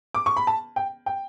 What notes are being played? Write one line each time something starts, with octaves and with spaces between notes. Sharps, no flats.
D6
C#6
B5
A5
G5
G5